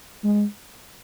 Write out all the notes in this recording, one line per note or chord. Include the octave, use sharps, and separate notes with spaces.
G#3